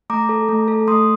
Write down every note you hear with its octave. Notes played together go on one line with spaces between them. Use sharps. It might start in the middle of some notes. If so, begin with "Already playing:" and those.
A3 A#5 D6
A4
A3
A4
A3 C6 D#6